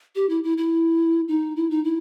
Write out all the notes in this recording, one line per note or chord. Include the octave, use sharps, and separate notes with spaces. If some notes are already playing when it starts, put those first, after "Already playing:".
G4
E4
E4
E4
D#4
E4
D#4
E4